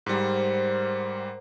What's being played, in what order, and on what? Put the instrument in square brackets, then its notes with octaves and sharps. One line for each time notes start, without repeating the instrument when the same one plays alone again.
[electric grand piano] G#2 G3 [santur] A#4 C5 F#5